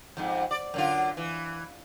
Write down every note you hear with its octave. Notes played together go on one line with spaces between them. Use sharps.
F2 G#2
D5
F#2 D3 F4
E3